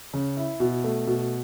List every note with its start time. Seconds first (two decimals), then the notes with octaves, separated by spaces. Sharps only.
0.14 C#3
0.37 E4
0.60 B2
0.84 A3
1.07 B2